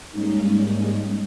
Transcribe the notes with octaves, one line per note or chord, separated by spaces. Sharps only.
G#2 G3 G#3 A#3 C#4 D#4